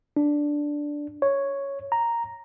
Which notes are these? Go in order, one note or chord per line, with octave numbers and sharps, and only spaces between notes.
D4
C#5
A#5